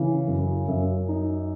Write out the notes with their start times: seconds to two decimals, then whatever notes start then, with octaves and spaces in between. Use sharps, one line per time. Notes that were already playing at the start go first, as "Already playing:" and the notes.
Already playing: C#3 E3
0.27 F#2
0.68 F#2
1.09 D#4